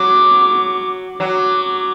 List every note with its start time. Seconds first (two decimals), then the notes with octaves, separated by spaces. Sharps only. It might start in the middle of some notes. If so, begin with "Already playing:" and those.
Already playing: F#3 D6
1.20 F#3 D6